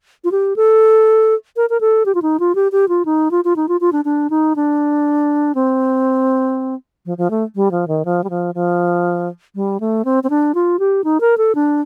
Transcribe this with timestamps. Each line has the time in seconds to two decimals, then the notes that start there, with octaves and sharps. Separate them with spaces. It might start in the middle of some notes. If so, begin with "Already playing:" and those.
0.24 F4
0.32 G4
0.56 A4
1.57 A#4
1.70 A#4
1.81 A4
2.06 G4
2.15 F4
2.22 D#4
2.40 F4
2.55 G4
2.72 G4
2.89 F4
3.05 D#4
3.31 F4
3.45 F4
3.56 D#4
3.69 F4
3.81 F4
3.92 D4
4.05 D4
4.30 D#4
4.56 D4
5.55 C4
7.06 F3
7.18 F3
7.30 A3
7.55 G3
7.71 F3
7.88 D#3
8.05 F3
8.24 G3
8.30 F3
8.55 F3
9.55 G3
9.80 A3
10.05 C4
10.24 C4
10.30 D4
10.55 F4
10.79 G4
11.04 D#4
11.21 A#4
11.38 A4
11.55 D4